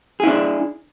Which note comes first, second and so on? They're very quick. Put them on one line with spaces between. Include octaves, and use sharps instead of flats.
G#4 E4 D4